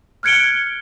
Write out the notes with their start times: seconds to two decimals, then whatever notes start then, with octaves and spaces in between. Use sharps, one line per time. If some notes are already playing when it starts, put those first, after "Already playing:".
0.23 F6 F#6 G#6 C#7 D7 G7